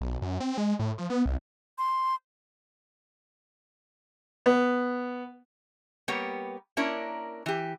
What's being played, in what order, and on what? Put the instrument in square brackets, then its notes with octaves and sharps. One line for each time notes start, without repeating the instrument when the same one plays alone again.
[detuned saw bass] B1
F#2
C4
G#3
A2
F3
B3
C2
[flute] C6
[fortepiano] B3
[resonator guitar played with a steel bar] G3 A#3 B3 G4 C#5
A#3 C#4 D4 E4 A#4
E3 G4